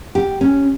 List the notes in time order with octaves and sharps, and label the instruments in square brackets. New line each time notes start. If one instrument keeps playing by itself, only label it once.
[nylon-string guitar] G4
C#4